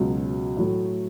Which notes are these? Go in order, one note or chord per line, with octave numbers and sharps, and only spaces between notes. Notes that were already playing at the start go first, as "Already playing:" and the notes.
Already playing: C#2 B2 F#3
A2 F#3 A3